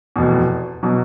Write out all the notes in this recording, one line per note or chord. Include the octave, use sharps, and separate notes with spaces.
F1 E2 B2
B2 F#3